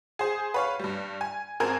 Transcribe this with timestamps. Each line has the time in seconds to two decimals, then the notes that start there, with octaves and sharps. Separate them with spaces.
0.19 G#4 C5
0.54 B4 C#5 F5
0.80 G2 G3
1.21 G#5
1.60 G#1 C4 A#4 G#5 A5 G#6